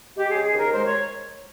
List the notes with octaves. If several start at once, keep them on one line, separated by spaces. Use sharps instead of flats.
G#3 G4
C#3 G#4
G#4
D#2 A#4
G#3 C5
C#5